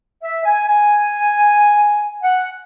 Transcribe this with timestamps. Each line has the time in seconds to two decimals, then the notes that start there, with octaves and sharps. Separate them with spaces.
0.23 E5
0.45 G#5
0.67 G#5
2.23 F#5